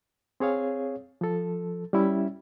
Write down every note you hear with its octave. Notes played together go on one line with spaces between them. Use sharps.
C4 G#4 C#5 F5
F3 A4
G3 C#4 E4 E5